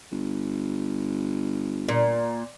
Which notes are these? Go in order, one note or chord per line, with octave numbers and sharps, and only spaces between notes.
G1
A#2